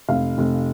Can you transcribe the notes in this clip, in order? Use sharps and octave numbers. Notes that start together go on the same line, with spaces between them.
F1 F5
F1